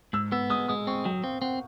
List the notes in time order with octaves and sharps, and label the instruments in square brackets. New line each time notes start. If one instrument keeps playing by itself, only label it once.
[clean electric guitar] G#2 [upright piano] E6
[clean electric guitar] B3 [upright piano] E6
[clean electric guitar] G#3 [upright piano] D#6
[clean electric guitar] G#3 [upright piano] D#6
[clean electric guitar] C4 [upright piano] C#6
[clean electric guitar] F#3 [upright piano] G5
[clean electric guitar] C4 [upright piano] F5
[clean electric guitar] C4 [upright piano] F#5